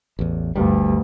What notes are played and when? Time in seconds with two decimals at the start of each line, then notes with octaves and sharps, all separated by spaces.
0.19 A1 E2
0.55 G1 D2 G2 G3